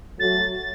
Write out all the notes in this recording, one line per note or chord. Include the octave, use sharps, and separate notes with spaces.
F#3 A3 A6
A6